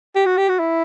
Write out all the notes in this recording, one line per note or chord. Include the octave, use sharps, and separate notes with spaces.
G4
F#4
G4
F#4
E4